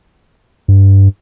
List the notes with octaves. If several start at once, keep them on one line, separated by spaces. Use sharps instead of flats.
G2